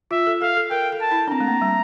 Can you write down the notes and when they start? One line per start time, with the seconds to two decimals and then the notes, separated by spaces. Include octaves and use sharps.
0.11 F4 E5
0.27 A4
0.42 A4 F5
0.57 A4
0.71 A#4 G5
0.92 A4
1.02 A5
1.11 E4
1.28 D4
1.31 C4 A#5
1.40 A3
1.48 A#3
1.62 G3